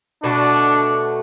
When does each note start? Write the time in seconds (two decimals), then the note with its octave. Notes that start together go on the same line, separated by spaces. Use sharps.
0.23 B2 A3 D4 F#4